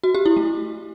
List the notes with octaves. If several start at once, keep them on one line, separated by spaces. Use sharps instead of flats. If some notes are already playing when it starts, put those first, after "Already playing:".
F#4
G4
E4
A3